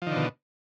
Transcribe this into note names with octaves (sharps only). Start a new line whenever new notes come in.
B2 D3 D#3 F3